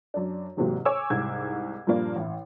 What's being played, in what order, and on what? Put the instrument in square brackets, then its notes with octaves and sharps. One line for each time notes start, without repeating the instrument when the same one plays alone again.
[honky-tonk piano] F#2 D4
E2 G#2 C3 F#3 A#3
C#5 G#5 D6 E6
C2 G#2 G#6
G2 A#2 F3 A#3 D4
A1 E4